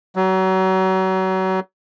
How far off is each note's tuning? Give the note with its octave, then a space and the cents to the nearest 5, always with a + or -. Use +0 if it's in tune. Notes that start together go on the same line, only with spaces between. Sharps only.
F#3 +30